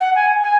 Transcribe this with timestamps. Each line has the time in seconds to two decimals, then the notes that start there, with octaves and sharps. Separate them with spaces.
0.01 F#5
0.15 G#5
0.43 G#5